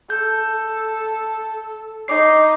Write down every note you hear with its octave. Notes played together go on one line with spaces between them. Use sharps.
A4 G6
D#4 D6 C7